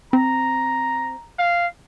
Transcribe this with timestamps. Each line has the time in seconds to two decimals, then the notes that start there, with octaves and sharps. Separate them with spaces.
0.13 C4 A#5
1.39 F5